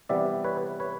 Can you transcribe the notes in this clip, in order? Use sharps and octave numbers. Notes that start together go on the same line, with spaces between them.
C3 E3 G3 B3 D5 E5
B4 C#5
B4 C#5